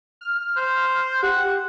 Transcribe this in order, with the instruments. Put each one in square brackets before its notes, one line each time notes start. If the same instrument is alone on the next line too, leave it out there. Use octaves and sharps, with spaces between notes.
[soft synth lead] F6
[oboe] C5
[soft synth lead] G4 [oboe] F#5